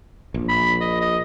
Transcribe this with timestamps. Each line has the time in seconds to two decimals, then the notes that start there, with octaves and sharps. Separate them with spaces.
0.34 A#1
0.49 B5
0.81 D#5
1.01 D#5